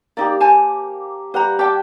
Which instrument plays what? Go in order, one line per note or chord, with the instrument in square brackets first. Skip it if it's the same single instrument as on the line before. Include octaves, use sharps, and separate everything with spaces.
[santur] A#3 G4 [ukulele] D#4 D5
[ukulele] C5 G#5 A5
[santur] G3 F#5 G5 [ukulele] B4 A#5
[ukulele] G4 G5 [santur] D5 A5 D6